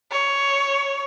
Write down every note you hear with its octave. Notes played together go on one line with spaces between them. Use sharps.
C#5